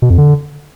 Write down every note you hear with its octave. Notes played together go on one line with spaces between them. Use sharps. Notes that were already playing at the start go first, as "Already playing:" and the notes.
B2
F2
D3